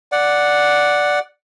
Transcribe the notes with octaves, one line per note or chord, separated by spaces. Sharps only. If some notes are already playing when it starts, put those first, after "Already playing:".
D5 F#5